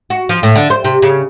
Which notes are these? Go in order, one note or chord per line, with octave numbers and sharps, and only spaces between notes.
F#4
F3
A2
D3
C5
C3
C#3